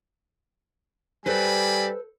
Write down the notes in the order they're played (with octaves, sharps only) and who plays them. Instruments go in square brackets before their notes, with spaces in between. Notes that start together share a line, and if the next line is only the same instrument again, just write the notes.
[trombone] G3 [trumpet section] C4 D5 B5 [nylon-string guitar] A4 B4 C5 [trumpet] G#5